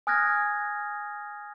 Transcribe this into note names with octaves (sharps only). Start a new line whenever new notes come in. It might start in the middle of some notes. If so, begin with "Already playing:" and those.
G#5 D#6 F6 F#6 G#6 A#6